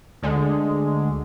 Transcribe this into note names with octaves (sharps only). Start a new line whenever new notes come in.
D2 D3 G#3